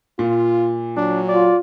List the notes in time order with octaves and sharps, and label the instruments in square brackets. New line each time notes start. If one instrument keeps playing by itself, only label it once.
[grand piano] A#2 [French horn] F4
[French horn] F#3 [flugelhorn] D4
[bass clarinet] F4 [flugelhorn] D5